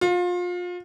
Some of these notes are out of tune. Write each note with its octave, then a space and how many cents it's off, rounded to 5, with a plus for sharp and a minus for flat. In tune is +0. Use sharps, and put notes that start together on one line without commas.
F4 +30